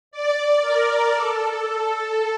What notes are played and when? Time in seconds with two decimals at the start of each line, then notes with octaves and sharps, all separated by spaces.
0.11 D5
0.61 A#4
1.12 A4